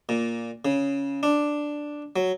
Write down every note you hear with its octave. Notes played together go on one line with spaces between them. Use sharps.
A#2
C#3
D4
F#3